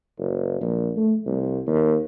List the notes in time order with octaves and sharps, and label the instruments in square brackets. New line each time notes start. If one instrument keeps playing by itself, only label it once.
[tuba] F#1
A#1
A3
C2
D#2